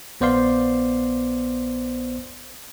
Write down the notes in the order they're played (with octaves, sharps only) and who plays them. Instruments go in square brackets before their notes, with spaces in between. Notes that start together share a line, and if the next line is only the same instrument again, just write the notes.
[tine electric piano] A#1 B3 C5 D5 F5 C6